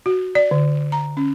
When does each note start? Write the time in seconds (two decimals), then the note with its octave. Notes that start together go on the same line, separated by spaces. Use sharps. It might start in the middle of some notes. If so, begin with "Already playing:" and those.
0.06 F#4
0.35 D5
0.51 D3
0.92 A#5
1.17 C#4